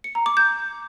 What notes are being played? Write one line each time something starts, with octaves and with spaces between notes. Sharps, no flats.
C#7
A#5
D6
G6